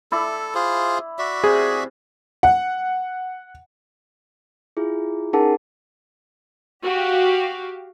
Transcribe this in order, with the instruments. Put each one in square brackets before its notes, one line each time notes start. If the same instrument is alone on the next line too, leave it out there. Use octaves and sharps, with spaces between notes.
[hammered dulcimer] E4 D5 [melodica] A4
[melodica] F4 G#4 C5
F#4 D5 E5
[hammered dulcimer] C3 [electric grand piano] G#4
[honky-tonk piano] F#5
[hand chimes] E4 F4 G#4
C#4 D#4 G#4 A#4 F#5 A5
[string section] F#4 G4 F5